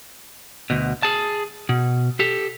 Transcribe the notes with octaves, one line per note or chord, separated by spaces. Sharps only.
D2 B2
G#4 A5
B2
G4 A4